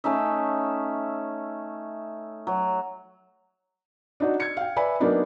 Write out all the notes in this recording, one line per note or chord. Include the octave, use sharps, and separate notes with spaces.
A3 C#4 D#4 E5
F#3
D4 D#4 F#4
G#6 C#7
F5 G5
B4 D5 E5 G#5 B5
F#3 A#3 B3 D4 D#4